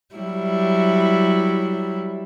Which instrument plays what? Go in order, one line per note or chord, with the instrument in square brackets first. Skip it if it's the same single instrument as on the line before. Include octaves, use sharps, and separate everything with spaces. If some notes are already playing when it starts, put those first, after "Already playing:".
[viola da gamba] F#3 G3 E4